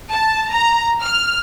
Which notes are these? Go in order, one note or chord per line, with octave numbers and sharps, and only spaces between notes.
A5
A#5
F6